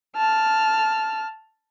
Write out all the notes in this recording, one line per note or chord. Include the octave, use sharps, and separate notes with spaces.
A5 F6